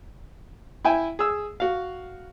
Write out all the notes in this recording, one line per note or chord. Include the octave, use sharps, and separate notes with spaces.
E4 E5 G5 G#5
G#4 E6
F#4 F5